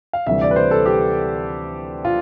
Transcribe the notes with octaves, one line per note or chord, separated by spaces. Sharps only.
F5
D2 C3 E3 G3 E5
D5
B4
C5
A4
G4
F4